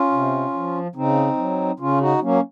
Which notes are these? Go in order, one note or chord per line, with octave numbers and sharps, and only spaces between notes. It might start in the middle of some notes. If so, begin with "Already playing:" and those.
Already playing: C#4 F4
C3
F3
C#3 C4 D#4
F#3
C#3 C#4 F4
D#4 F#4
F#3 A#3 C#4